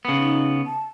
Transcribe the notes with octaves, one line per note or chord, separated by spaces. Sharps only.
C#3 B3
D#4
A5